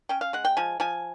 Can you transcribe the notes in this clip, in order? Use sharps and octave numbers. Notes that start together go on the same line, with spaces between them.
C#4 G5
F5
G#3 F#5
G5
F3 G#5
F3 G#5